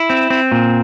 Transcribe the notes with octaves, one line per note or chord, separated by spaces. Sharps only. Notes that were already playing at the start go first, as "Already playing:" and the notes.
Already playing: E4
C4
C4
A#2